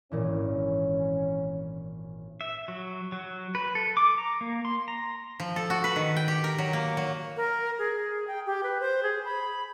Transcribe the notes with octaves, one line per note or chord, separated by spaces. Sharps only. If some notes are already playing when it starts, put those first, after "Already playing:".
G#1 A#2 E3 C#4
E5
F#3
F#3
B4
A4
D6
A#5
A#3
C6
A#5
F3
A4
F#4
B4
D#3
G5
G4
A#4
F#3
A#3
F#3
A#4
G#4
G5
G4
B4
C5
G#4
B5